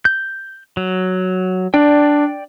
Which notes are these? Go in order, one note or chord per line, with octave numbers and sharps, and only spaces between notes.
G6
F#3
D4 D5 G5